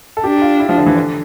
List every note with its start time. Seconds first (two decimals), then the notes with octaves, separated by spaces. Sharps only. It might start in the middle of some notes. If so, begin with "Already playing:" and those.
0.17 A4
0.24 D4 G4
0.42 F4
0.60 E4
0.69 F3
0.78 D3
0.87 E3
0.96 D3